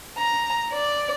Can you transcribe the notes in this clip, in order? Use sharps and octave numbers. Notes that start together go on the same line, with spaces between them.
A#5
D5